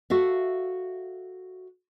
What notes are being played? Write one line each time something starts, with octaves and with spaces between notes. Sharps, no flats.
F#4 A4 E5 F5